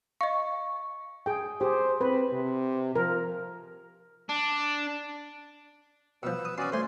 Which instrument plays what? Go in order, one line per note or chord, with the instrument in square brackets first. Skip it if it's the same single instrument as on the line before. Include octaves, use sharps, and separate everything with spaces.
[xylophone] D#5 F5 [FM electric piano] C#6
[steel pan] G#4 G5
[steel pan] G4 G#4 [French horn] C5
[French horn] C4 [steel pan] B4
[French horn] C3
[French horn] F3 [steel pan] A#4
[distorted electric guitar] D4
[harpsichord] B2 F3 [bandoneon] B3 B4 E6
[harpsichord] D#6
[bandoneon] C#4 F#4 D5 [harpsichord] C6 D#6
[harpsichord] A3 C5 [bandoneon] G#5 C6